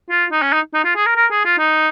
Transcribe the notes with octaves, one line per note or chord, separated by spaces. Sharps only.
F4
D#4
C#4
D#4
D#4
F4
G#4
A#4
A#4
G#4
F4
D#4